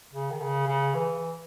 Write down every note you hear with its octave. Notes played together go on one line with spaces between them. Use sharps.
C#3
D#3
C#3
C#3
E3